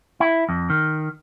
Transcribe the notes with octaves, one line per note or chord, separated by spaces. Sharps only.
E4
F2
D#3